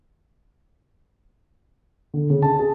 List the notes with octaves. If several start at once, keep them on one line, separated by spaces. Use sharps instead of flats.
D3
C#3
A5
G#4